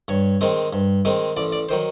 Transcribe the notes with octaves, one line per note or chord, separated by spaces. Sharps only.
G2 C#5
D#3 G#3 C4
G2
D#3 G#3 C4
A1 D5
D5
D#3 F#3 C5